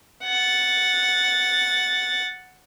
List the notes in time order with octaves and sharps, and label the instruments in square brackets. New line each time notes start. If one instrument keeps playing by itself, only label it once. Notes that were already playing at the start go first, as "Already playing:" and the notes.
[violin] F#5 A6